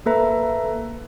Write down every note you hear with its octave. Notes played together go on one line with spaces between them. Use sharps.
A#3 A4 B4 E5 A#5